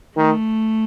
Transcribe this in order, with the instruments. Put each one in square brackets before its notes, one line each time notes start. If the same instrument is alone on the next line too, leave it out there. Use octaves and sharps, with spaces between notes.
[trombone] D#3 [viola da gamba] A3